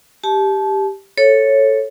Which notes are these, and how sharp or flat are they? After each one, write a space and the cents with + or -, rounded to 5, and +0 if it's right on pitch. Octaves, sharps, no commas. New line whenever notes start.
G4 +0 A5 -30
A4 +0 C#5 -10